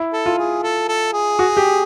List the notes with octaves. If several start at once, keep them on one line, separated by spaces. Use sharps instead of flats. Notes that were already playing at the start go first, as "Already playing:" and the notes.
Already playing: E4
A4
F4
G#4
A4
A4
G#4
F#4
G4